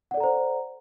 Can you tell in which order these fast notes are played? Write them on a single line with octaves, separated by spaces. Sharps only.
F#5 D5 A4 A#5 C5